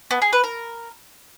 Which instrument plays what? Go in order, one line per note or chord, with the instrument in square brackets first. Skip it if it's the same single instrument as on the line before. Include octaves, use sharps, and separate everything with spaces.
[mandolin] B3
G#4
B4
A#4